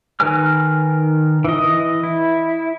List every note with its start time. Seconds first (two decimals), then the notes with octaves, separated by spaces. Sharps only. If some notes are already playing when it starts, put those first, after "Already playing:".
0.20 D#3 A#4 B4 G#5 F6
1.45 E3 D#5
2.03 E4